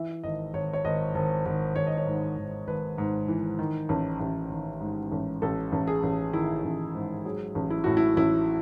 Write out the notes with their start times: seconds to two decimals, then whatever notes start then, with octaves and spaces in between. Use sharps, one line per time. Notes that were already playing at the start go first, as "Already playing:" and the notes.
Already playing: E3 E5
0.24 G#1 D#5
0.54 G#1 C#5
0.73 C#5
0.84 G#1 D#5
1.15 G#1
1.45 G#1
1.76 G#1 C#5
1.87 D#5
1.97 C#5
2.07 G#2
2.37 G#1
2.67 G#1 B4
2.98 G#2
3.28 E3
3.59 D#3
3.89 A1
4.20 A1
4.50 D#3
4.80 G#2
5.12 A1
5.42 A1 A4
5.72 A1
5.87 G#4
6.03 A1
6.33 D#3 E4
6.64 A1
6.95 G#2
7.25 F#3 G#4
7.55 A1
7.70 E4
7.84 A2 F#4
7.97 E4
8.17 A1 E4